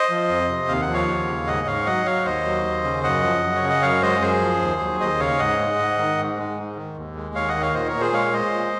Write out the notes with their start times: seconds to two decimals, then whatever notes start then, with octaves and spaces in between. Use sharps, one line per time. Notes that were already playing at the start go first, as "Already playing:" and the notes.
Already playing: C5 D#5
0.10 F3
0.29 F2
0.49 C3
0.68 D#2 F5
0.81 F#5
0.88 F3
0.94 C#5 F5
1.08 D#2
1.27 C#3
1.47 G#2 D#5 F#5
1.67 G#2 C#5 F5
1.86 F#3 D#5 F#5
2.06 F#3 C#5 F5
2.25 D#2 C5 D#5
2.45 F#3
2.65 D#2
2.84 C#3
3.04 F#2 D#5 F#5
3.23 F3
3.42 F#2
3.56 C#5
3.62 C#3
3.69 D#5
3.82 F#2 C#5 F5
4.02 G#3 C5 D#5
4.21 F#2 G#4 C5
4.41 F3
4.61 D#2
4.81 F#3
5.00 D#2 C5 D#5
5.19 C#3 C#5 F5
5.39 G#2 D#5 F#5
5.59 G#3
5.78 G#2
5.98 D#3
6.18 G#2
6.38 G#3
6.57 G#2
6.76 D#3
6.97 D#2
7.15 G#3
7.35 D#2 C#5 F5
7.48 D#5 F#5
7.55 D#3
7.61 C#5 F5
7.74 A#2 C5 D#5
7.88 A#4 C#5
7.94 A#2
8.01 G#4 C5
8.13 G#3 C#5 F5
8.33 G#3 C5 D#5
8.53 A#2